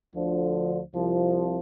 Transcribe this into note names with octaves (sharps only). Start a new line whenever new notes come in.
D2 D3 F3
C2 C3 F3